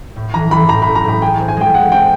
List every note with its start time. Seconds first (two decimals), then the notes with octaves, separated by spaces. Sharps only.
0.16 A2
0.34 E3 A#5
0.51 E3 B5
0.69 A2 A#5
0.82 B5
0.87 A3
0.95 A#5
1.04 A2 B5
1.22 G#4 G5
1.39 C4
1.48 G#5
1.57 G#3 G5
1.74 G#3 F#5
1.92 C4 G5